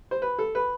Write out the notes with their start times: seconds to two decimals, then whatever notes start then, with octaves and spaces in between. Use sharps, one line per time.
0.11 C5
0.22 B4
0.39 A4
0.55 B4